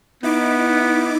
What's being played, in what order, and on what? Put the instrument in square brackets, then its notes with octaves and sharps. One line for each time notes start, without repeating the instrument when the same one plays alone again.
[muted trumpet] B3 [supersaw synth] D#4 E4 D6